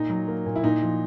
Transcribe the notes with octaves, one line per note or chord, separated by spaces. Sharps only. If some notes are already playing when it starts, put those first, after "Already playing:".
Already playing: A#2 D#4
F#3
A#3
A#2
E4
A#2 D#4
F3